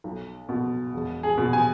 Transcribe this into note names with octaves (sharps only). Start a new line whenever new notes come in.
B1
B2
E1
G#4
B2
G#5